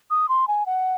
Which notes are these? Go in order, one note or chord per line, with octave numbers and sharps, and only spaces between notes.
D#6
C6
G#5
F#5